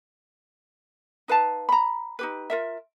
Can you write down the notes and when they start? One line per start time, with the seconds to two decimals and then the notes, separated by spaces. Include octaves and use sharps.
1.28 D#4 B4 F5 A5
1.69 A#5 B5
2.19 D#4 G4 B4
2.50 F4 A#4 E5